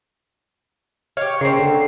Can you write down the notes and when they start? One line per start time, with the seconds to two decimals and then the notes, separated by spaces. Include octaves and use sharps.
1.17 G4 C#5 F5
1.41 C#3 A#3 C4 C7
1.59 D3